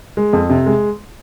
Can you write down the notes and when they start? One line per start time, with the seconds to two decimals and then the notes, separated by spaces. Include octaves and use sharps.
0.17 G#3
0.33 F2
0.50 C3
0.66 G#3